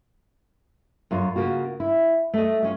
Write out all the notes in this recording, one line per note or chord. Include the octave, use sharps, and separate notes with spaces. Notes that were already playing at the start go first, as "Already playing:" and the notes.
F#2 F4 C#5
C#3 A#3 F4 F#4
E4
A3 D#5
G3 C#4 F4